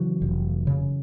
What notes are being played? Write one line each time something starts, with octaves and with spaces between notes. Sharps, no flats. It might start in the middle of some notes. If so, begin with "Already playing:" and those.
Already playing: C#3 E3 F#3
F1
C#3